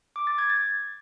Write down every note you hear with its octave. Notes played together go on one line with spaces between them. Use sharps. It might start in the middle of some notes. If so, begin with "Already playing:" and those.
D6
A6
G#6
A6